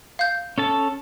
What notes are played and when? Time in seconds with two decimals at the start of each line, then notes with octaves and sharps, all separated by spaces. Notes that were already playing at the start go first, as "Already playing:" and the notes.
0.19 F5 G6
0.58 C#4 A4 A5